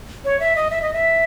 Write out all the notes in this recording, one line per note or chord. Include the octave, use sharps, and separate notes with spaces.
C#5
E5
D#5
E5
D#5
E5